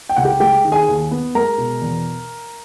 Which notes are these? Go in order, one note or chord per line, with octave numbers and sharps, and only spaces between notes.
G5
C#2 F#5
G4 G5
G#3 G4 G5
D#3
G#4 G#5
D#2
B3
G#3 A#4 A#5
B2
E2